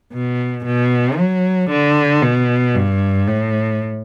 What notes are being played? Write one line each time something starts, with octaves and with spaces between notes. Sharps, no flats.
B2
B2
F#3
D3
B2
G2
A2